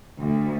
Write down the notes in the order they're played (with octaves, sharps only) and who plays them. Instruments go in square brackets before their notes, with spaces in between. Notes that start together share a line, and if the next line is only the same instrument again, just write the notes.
[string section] D2